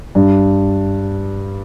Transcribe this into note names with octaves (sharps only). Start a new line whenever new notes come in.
G2